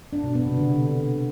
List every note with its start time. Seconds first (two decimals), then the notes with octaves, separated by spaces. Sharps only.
0.13 D4
0.24 B2
0.35 B3
0.46 C3
0.58 D3